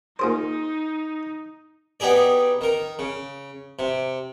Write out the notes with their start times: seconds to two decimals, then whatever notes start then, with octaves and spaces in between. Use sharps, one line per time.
0.19 A#2 D#4 G#4 C5
2.00 B3 D#4 G4 G#4 D5
2.61 D#3 A#4
2.99 C#3
3.79 C3